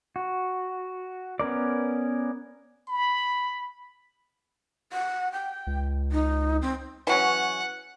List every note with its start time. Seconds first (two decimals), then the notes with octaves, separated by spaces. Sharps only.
0.16 F#4
1.39 B3 C#4 A#4 D5
2.88 B5
4.93 F#5
5.32 G5
5.67 C#2
6.12 D#4
6.62 C4
7.07 E3 F#3 C#4 F#5